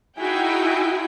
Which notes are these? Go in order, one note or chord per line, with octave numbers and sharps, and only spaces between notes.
D#4 E4 F#4 G#4 G5